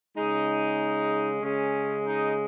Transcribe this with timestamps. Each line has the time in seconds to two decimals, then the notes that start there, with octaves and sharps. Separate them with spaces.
0.17 C#3 G#3 D#4
1.41 C#3 G#3 C#4
2.05 D#4